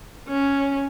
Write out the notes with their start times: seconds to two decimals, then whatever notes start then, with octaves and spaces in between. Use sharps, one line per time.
0.28 C#4